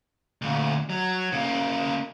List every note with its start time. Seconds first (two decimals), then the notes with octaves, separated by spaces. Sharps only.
0.42 D2 A#2
0.90 F#3
1.33 C#3 A#3